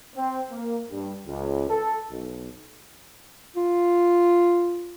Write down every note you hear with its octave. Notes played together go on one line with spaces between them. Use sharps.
C4
A#3
G2
C#2
A4
B1
F4